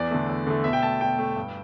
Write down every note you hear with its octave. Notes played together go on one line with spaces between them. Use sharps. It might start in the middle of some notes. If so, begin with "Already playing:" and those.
Already playing: E2 D5
D3 A3
E2
D3 A3
B2 E5
G5
A3 A5
B2 G5
A3
G2